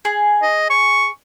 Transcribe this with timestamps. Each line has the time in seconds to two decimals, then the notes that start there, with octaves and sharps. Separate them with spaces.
0.05 G#4
0.42 D#5
0.70 C#6